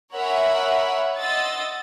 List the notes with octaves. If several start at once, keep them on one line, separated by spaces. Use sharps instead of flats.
A#4 C#5 E5 F#5 G#5 B5
D#5 F#5 C6 D#6 E6 A6